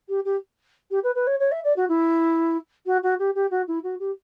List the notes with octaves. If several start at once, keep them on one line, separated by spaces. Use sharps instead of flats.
G4
G4
G4
B4
B4
C#5
C#5
E5
D5
F#4
E4
F#4
F#4
G4
G4
F#4
E4
F#4
G4